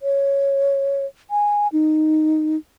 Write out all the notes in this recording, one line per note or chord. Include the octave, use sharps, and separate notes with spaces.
C#5
G#5
D#4